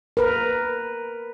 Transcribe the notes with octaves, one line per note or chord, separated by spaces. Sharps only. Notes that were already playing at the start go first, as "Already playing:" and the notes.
A#4 B4